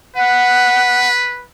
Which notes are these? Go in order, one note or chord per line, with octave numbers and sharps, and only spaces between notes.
B4 F#5